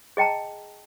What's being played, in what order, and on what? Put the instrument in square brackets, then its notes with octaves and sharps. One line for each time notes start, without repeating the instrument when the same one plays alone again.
[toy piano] G#4 D#5 G5 A5 A#5